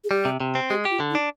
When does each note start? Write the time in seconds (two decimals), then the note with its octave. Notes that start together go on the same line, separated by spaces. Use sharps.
0.04 G#4
0.10 G3 G4
0.25 C3
0.40 C3
0.55 C4
0.70 G#3 G4
0.85 G4
0.90 F4
1.00 D3
1.10 D#4
1.15 D4